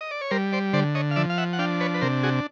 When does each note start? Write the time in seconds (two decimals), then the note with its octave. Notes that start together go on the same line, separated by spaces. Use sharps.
0.01 D#5
0.11 D5
0.21 C#5
0.30 G3 A#4 C5
0.52 C5 D5
0.73 D3 C5 D5
0.95 C#5 D#5
1.11 F5
1.16 F3 D5 E5
1.30 F5
1.38 E5 F#5
1.53 F#5
1.59 D4 F5 G5
1.80 B4 C#5
1.94 B4
2.01 C3 A#4 C5
2.23 F#4 G#4